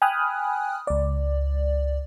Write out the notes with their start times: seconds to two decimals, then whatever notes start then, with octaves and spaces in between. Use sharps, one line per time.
0.02 G5 G#5 B5 D#6 F6 F#6
0.87 C#2 D5